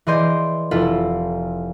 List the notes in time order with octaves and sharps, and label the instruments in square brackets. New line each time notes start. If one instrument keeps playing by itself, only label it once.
[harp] E3 G#4 D5 D#5 C6 G6
F1 E4 F4 A4